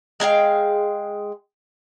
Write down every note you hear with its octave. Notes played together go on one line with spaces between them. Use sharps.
G#3 G#4 F5 G5